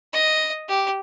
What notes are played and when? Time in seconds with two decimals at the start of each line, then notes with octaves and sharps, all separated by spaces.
0.13 D#5
0.69 G4